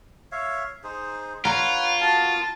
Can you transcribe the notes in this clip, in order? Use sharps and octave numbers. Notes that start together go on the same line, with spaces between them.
C#5 E5 F5
D#4 G#4 C5
F4 B4 C#5 F#5 A#5
B3 F#4 A#4 A5